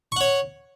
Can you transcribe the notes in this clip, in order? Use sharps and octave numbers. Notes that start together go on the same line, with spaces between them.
C#5 F#5 C#6